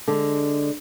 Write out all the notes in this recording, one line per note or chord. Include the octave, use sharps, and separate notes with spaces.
D3 G#3